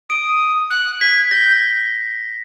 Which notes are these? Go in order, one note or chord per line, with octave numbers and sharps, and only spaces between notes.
D#6 D7
F#6
G#6 B6
G6 A#6